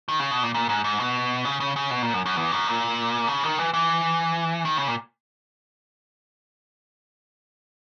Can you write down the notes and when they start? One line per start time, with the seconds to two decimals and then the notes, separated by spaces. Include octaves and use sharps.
0.09 D#3
0.19 C#3
0.31 B2
0.43 A#2
0.54 A#2
0.69 G#2
0.84 G#2
1.00 B2
1.45 C#3
1.60 C#3
1.76 C#3
1.91 B2
2.02 A#2
2.14 F#2
2.26 F#2
2.37 E2
2.52 F#2
2.67 A#2
3.28 C#3
3.43 D#3
3.58 E3
3.74 E3
4.65 D#3
4.76 C#3
4.88 A#2